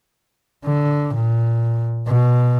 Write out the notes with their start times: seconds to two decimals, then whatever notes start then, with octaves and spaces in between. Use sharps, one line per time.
0.65 D3
1.15 A#2
2.07 B2